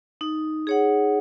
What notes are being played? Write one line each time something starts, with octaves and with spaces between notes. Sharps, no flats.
D#4
G#4 C#5 F#5